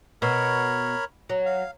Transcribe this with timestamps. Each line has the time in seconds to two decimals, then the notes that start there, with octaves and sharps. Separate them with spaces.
0.22 B2 A#4 C#5 B5
1.30 F#3
1.46 F5